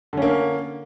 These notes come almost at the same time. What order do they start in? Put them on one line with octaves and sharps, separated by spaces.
D3 C#4 A#3